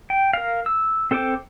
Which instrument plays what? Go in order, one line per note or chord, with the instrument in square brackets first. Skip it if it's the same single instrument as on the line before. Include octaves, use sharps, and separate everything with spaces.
[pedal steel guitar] G5
A#4 F5
E6
C4 A4 C5 G5 D6